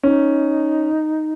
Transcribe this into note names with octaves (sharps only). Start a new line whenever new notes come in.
C#4 D#4